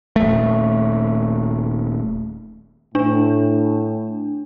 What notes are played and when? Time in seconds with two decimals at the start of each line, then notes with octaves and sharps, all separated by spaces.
0.16 D#1 A3
2.95 A2 D4